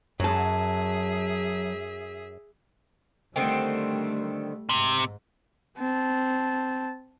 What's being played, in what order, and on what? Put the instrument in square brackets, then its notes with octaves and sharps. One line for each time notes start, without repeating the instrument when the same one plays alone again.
[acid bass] F#2 [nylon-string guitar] F#3 A5 [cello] G#4 E5
[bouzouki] D3 D#3 C4 [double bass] G3 A3
[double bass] G#2 [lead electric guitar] C3
[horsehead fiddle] C4 A5